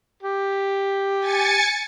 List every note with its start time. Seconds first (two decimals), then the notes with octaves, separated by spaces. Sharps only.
0.23 G4
1.19 G#5 A6 C#7